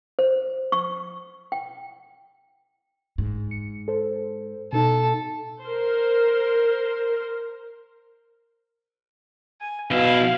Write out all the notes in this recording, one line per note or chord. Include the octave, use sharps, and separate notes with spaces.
C5
C#6
G5
G#2
C#7
A4 C5
B2 D#4 A4
A#4 C5
G#5
B1 B2 E4 F5